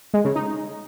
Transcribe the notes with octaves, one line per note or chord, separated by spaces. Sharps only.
G#3
C#3
D#4